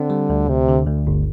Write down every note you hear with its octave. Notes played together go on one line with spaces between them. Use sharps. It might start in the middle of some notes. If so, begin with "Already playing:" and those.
Already playing: D3 C4
G3
D2
D2 C3
D3
D2
G1